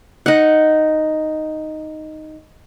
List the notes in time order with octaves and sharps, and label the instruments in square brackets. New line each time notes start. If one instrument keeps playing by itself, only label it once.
[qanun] D#4 F#5